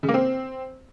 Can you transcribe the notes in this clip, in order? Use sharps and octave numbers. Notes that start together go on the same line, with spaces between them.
C#3
A#3
C4